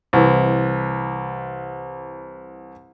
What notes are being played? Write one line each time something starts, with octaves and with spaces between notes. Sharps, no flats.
C2 E3